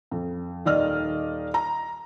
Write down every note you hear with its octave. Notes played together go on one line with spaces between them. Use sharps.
F2
D#1 D#3 D5 D#5 F6
A#5